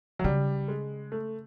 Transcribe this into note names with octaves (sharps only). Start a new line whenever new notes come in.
F#3
C#3 G3
G#3
A3